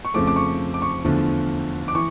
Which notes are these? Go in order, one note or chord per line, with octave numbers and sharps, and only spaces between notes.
C#6
F2 C#3 F3 A3 D6
D6
C#6
D6
C#6
E2 D3 F3 A3
D6
E3 C#6